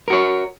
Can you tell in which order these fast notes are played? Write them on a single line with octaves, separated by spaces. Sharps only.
A#4 F#4 C#5